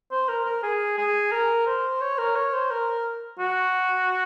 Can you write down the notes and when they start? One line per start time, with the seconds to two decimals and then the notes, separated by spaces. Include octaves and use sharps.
0.11 C5
0.29 A#4
0.45 A#4
0.63 G#4
0.98 G#4
1.32 A#4
1.67 C5
2.01 C#5
2.18 A#4
2.36 C#5
2.53 C5
2.71 A#4
3.39 F#4